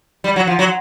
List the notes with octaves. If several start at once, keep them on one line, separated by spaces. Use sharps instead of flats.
G3
F#3
F3
F#3